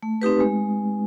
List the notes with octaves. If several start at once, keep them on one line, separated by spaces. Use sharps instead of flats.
A3
C4 D#4 G4 B4
G#3